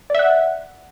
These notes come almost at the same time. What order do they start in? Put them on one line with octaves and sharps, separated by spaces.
D5 E5 F#5